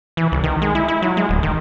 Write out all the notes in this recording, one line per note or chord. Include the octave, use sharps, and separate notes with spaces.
E3
C2
D#3
G#3
E4
E4
F#3
G#3
D1
D#3